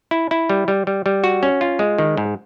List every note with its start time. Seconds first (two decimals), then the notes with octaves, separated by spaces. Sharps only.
0.11 E4
0.31 E4
0.49 G3
0.68 G3
0.87 G3
1.06 G3
1.24 F#4
1.43 C#4
1.61 F4
1.79 G#3
1.98 D#3
2.17 G#2